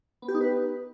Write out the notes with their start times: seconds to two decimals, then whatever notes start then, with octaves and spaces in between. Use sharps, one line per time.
0.22 B3
0.28 G4
0.35 D#4
0.41 B4